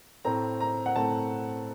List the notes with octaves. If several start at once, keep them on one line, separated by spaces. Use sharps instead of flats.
A2 A3 C4 A#5
A#5
F#5
A2 A3 C4 A5